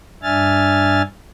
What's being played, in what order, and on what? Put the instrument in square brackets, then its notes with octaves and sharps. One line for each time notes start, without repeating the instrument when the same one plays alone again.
[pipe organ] G2 D4 E5 G#5 F6 A6